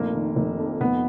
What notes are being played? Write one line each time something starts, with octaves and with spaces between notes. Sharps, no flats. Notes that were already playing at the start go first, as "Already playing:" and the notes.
Already playing: F1 A#1 A#2 A#3
D#3
F1
F2
F1 B3